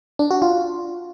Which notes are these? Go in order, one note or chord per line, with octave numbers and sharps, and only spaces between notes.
D4
F#4
F4